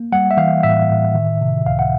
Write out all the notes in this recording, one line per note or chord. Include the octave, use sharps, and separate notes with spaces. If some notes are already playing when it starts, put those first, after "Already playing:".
Already playing: A#3
G3 F#5
E5
E3 F5
A2 E5
A2
D#3
C3
C#2 F5
F#5